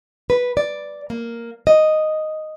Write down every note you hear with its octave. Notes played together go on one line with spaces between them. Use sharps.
B4
D5
A#3
D#5